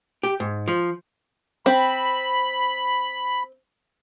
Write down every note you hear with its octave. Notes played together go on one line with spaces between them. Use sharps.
G4
G#2
F3
C4 B5